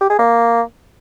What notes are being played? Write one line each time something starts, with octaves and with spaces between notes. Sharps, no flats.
G4
G#4
A#3